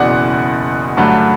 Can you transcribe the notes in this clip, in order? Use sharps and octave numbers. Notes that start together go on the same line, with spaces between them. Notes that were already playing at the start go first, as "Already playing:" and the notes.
Already playing: F#1 E2 B2 D5 F#5
G2 D3 F#3 A3